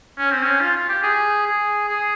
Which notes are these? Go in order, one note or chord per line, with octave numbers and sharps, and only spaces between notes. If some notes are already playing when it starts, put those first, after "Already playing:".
C#4
C4
C#4
F4
F4
G4
G#4
G#4
G#4